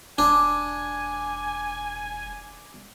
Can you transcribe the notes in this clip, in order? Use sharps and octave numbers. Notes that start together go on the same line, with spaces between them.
E1 D4 G#5